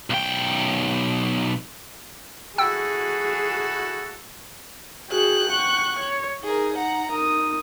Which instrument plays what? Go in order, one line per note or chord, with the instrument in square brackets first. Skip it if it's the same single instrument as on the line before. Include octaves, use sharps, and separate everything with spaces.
[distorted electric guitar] B1 G5
[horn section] E4 F#4 [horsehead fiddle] G#4 [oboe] A4 [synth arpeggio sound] G5 E6
[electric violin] F#4 G#4 [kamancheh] G5 F#6
[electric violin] F#5 C#6
C#5
[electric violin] D#4 [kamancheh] G#4 A#4
[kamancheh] F#5 A#5
[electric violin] D#4 D#6 [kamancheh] A#4